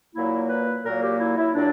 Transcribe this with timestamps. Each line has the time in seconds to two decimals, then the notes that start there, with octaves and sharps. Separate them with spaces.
0.15 A#2 F#3 A#3 E4
0.49 B4
0.85 A#2 F#3 A#3 A#4
1.03 G4
1.20 E4
1.37 E4
1.55 A#2 F#3 D4